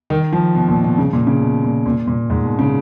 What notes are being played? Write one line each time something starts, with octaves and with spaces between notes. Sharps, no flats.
D#3
F3
B2
A#2
B2
C#3
A#2
C#3
B2
A#2
A#2
A#2
G#2
B2
C#3